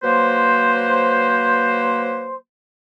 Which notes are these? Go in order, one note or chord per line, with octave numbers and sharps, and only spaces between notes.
F#3 A#3 B4 C5